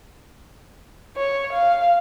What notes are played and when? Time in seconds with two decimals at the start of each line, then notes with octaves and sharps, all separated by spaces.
1.17 C#5
1.53 F5